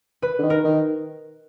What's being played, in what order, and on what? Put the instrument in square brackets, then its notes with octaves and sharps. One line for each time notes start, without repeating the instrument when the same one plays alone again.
[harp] B4
[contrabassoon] D3
D#3
[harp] A#4
[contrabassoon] D#3